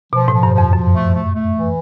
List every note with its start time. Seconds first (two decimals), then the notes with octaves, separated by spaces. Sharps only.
0.13 B2 F3
0.28 A2
0.33 F3
0.43 G2
0.53 F3
0.58 F2
0.73 F#2 F3
0.94 A3
1.13 A3
1.34 A3
1.54 E3